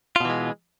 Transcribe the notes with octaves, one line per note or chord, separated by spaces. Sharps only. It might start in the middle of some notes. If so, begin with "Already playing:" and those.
B2 E3 G#3 F4